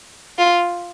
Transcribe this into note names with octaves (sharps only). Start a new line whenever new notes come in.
F4